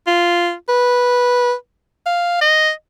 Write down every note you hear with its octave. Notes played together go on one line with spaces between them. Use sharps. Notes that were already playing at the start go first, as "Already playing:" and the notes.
F4
B4
F5
D#5